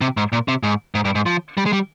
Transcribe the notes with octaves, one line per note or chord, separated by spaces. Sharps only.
C3
G#2
A#2
C3
G#2
G#2
G2
G#2
F3
G3
G#3
G3